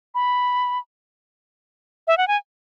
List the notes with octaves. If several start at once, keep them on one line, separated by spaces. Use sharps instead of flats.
B5
E5
F#5
G#5